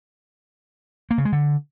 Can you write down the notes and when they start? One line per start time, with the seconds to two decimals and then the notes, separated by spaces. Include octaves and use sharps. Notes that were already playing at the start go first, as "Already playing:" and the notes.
1.11 A#3
1.18 C#3
1.25 G#3
1.32 D3